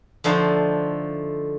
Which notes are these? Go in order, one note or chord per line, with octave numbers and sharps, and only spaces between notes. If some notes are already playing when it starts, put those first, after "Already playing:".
D3 F3 A3 D#4 C5